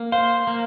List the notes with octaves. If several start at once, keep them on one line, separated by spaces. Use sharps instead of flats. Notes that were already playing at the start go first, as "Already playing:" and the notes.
Already playing: A#3
C5 F5
A#3